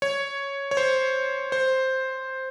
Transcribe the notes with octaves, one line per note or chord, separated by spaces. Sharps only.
C#5
C#5
C5
C5